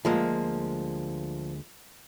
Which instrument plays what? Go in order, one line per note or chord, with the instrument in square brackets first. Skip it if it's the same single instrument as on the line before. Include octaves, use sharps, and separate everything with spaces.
[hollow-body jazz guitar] D2 G#3 A#3 [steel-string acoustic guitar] F3